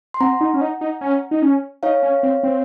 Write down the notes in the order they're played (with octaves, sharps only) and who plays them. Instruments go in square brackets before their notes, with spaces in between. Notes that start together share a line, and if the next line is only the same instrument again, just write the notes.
[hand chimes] C6
[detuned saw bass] C4 [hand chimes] F#5 A#5
[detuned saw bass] D#4
C#4
D#4
D#4
C#4
D#4
C#4
[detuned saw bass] D#4 [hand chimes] C#5 F5
[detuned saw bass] C#4
C4
C4